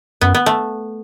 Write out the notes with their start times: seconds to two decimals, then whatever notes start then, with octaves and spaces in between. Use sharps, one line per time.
0.21 F#2 B3
0.35 B3
0.46 A3